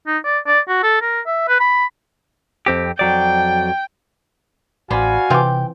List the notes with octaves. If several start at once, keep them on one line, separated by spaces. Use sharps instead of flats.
D#4
D5
D5
F#4
A4
A#4
E5
B4
B5
F2 C4 G4
F2 F#3 D5 G5
A1 F#4 C5 D5 F5 G#5 B5
C3 E3 C4 F4 G5 D6